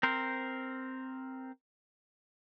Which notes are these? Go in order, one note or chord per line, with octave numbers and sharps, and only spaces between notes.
C4 A#4 C5